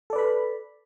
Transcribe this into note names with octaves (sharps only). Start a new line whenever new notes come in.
A4 B4 D5 B5